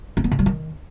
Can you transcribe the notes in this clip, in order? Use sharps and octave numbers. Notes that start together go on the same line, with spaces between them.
C#4
B3
C#3
G3
D#3